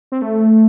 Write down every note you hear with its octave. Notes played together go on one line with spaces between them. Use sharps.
C4
A3